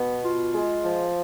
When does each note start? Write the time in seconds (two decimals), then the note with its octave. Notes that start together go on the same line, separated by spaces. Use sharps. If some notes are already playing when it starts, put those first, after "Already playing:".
Already playing: B2 B3
0.23 F4
0.54 G#3
0.84 F3